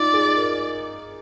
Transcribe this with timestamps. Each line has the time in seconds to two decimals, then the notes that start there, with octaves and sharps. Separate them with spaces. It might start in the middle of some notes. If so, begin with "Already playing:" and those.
Already playing: D#4 F4 D5
0.13 G#4
0.37 A#4